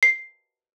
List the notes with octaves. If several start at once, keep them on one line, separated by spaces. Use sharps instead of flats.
C7